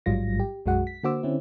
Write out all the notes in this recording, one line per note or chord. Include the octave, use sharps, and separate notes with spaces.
A1 G#2 F#3 G3 F4 A#6
G4
B1 F#2 G#3 F#4 F#5
B6
D3 A#3 F#4 C5 D6 E6
D3 C4 C#4 E4